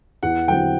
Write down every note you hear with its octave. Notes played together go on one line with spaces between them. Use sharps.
E2 F#5
D3 F#3 C4 E4 G5